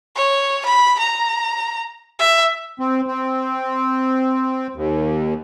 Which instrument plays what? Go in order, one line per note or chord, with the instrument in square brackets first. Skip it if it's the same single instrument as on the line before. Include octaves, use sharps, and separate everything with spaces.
[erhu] C#5
B5
A#5
E5
[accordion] C4
C4
D#2